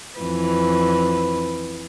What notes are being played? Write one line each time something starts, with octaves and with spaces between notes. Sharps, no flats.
F2 E3 B4